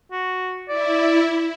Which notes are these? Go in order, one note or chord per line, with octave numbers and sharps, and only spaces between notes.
F#4
E4 D5